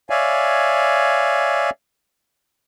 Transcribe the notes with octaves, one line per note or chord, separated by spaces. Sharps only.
C#5 D5 E5 F5 G#5